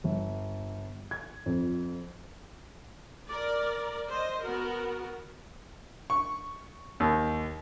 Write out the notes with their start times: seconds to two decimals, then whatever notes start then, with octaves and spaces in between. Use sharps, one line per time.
0.04 G1
1.11 G#6
1.46 F2
3.28 A#4 D5
4.08 C5 D#5
4.43 B3 F#4 A#4
6.10 C#6
7.00 D#2